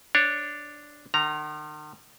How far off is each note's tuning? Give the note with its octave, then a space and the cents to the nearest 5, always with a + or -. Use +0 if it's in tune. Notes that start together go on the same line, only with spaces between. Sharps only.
D4 +0 C#5 -15
D#3 -45 A#5 +0